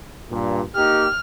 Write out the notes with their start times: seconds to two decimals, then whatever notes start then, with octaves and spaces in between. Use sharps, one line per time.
0.30 G2 A#2
0.76 A#3 D#4 G4 F6